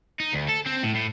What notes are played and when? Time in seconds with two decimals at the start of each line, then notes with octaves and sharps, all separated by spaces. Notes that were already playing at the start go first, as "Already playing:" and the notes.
0.20 D#4
0.33 D2
0.48 A4
0.66 C4
0.83 A2
0.94 A2